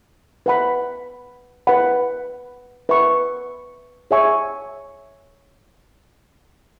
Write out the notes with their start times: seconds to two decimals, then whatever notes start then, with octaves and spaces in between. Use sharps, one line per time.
0.46 B4 F#5 B5
1.67 B4 F#5 B5
2.89 B4 E5 C#6
4.11 G#4 C#5 E5 G#5 C#6